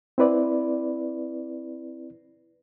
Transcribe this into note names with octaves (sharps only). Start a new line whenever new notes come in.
C4 E4 B4 D5